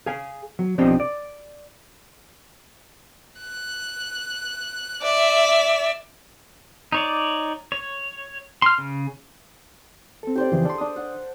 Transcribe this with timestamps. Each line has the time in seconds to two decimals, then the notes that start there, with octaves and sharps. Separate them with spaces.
0.06 G#4 F5 G#5
0.59 F#3
0.78 B1 F3 C4 D4 G4 D#5
1.00 D5
3.41 F#6
5.02 D5 E5
6.92 D#4 C#5 D5
7.72 C#5
8.62 C6 F6
8.78 C#3
10.23 C4 A4
10.35 G4 C5 D5
10.52 F2 C#3 E3 G#4
10.65 D4 A4 C6
10.78 D4 D#6
10.96 F#5